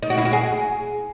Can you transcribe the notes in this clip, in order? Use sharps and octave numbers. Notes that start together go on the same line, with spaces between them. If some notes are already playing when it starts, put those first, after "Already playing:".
D#4
F#4
E4
F#4
G#4